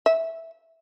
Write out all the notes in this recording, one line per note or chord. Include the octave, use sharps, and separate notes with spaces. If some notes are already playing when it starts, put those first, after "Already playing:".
E5